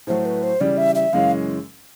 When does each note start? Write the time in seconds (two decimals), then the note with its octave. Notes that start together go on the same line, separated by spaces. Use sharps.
0.07 A2 F#3 A3 C5
0.25 B4
0.43 C5
0.60 C#3 E3 G3 D5
0.77 E5
0.95 E5
1.13 F#2 C#3 E3 G#3 C#4 F5